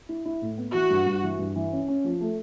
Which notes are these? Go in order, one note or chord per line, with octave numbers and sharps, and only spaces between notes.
E4
E4
A2
B3
E3 F#4
G2
G2
E3
G2
E3
C#4
C#4
F3
A3